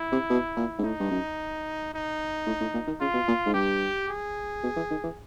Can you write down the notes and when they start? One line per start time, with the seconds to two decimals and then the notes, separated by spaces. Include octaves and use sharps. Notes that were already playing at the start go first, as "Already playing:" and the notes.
Already playing: E4
0.12 C3
0.30 B2
0.56 A#2
0.78 G#2
0.84 A2 D#4
1.00 G2
1.11 F#2
1.92 D#4
2.46 A2
2.60 A2
2.74 A#2
2.87 D#3
3.01 C#3 F4
3.14 B2
3.28 A#2
3.46 G#2
3.54 G2 G4
4.09 G#4
4.63 B2
4.76 E3
4.90 D#3
5.03 E3